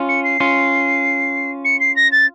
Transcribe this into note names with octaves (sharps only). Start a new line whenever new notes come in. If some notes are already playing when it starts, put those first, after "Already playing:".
Already playing: C#4 F4
C#7
C7
C#4 F4
C#7
C7
A#6
A6